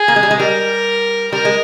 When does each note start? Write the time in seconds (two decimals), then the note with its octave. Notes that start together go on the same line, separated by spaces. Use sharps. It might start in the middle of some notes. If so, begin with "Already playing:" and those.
Already playing: G#4
0.08 A#3
0.16 G#3
0.23 G3
0.31 G#3
0.39 G3 A#4
1.32 G3 A#4
1.45 G#3